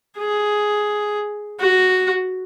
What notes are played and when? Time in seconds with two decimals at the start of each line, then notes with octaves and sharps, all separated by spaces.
0.18 G#4
1.60 F#4